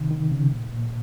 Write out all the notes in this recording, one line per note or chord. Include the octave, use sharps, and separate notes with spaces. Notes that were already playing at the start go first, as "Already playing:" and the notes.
Already playing: C3 D#3
D#3
C#3
A#2
A#2